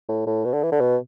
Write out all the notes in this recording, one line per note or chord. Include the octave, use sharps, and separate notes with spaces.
A2
A2
B2
D3
E3
D3
B2